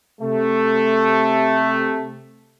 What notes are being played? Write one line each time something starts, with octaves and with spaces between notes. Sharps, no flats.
C3 A3